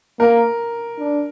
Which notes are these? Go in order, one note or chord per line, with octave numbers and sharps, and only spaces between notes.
A#3 A#4
D4